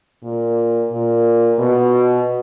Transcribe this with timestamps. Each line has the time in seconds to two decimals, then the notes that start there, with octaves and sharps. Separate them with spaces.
0.24 A#2
0.92 A#2
1.59 B2